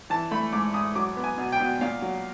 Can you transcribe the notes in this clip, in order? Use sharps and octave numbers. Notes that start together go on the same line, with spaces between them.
E3 A5
A3 B5
G#2 D6
G#2 D#6
F#3 D6
B3
G#5
B2
G5
B2
A#2 F5
F#3